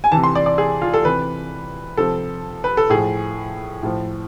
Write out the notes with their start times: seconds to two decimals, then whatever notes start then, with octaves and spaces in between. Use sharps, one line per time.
0.04 G#5
0.12 C3 E3 A5
0.24 C6
0.35 D5
0.46 D5
0.58 G#4
0.82 F4
0.94 A4
1.05 C3 E3 B4
1.97 C3 F3 A4
2.64 B4
2.77 A4
2.90 A2 F3 G#4
3.83 A2 F3